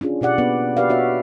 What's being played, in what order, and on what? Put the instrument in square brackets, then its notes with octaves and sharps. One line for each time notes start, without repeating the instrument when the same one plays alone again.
[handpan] C#4 D4 F4 G#4
B2 G4 D5 F#5
A#3 B3 D4 B4
F#4 G4 B4 D5 F5
B3 D4 F#4 C#5 E5